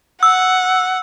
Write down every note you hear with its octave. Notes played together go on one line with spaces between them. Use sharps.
F#5 E6